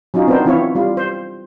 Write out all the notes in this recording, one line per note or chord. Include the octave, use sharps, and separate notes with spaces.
F#3 C#4 D#4 F4
B3 C4 D4 D#4 A#4 C5
E3 C4 E4 F4 C#5
G3 F4
C5